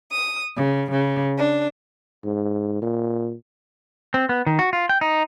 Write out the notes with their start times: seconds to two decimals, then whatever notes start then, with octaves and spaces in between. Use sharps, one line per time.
0.11 D#6
0.57 C#3
0.90 C#3
1.38 D4
2.25 G#2
2.82 A#2
4.14 C4
4.29 B3
4.46 D#3
4.59 F#4
4.73 F4
4.89 G5
5.01 D#4